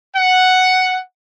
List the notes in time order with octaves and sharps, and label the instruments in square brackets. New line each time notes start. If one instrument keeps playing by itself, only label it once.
[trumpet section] F#5